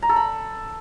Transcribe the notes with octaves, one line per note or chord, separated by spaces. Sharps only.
A#5
A4
B5